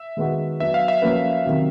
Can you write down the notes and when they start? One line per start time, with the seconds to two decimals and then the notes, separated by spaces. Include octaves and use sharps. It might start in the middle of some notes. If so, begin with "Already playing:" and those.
Already playing: E5
0.17 D#3 G#3 B3 D#4 F#4
0.60 F#3 B3 D4 E5
0.74 F5
0.88 E5
1.02 F3 A#3 C#4 F#4 B4
1.46 C3 D#3 F#3